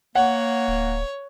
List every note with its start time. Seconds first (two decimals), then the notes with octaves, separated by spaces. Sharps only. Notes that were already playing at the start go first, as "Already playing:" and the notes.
0.15 A#3 C#5 F#5
0.68 D1